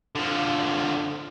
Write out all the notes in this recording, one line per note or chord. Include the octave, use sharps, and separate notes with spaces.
D3 F3